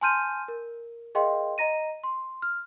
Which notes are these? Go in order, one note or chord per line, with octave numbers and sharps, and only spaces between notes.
G#5 A5 C6 F6 G6 D#7
A#4
G#4 A#4 D#5 F5 G5 C6
D#5 A#5 A#6 D#7
C6
F6